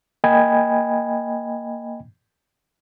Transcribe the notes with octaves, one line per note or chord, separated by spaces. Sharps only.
A#3 D#5 G5 G#5 B5 G#6